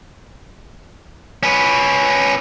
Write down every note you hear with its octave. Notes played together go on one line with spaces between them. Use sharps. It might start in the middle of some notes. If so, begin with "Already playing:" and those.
C#4 B4